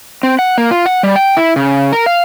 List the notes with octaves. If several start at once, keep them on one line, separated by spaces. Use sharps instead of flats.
C4
F#5
A#3
F4
F#5
G3
G5
E4
C#3
A#4
F5